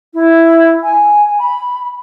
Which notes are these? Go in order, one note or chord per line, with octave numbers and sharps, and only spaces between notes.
E4
G#5
B5